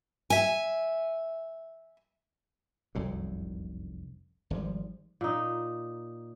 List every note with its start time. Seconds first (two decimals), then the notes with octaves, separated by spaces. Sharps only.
0.30 E5 G#5
2.95 F1 C2 F#2 A2
4.50 G#1 G#2 F3 G3
5.21 A#2 D#4